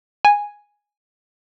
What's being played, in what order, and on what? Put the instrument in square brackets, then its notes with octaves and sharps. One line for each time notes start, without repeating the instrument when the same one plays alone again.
[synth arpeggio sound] G#5